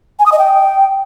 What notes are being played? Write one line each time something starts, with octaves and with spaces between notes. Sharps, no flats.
G#5
D#6
D#5
G5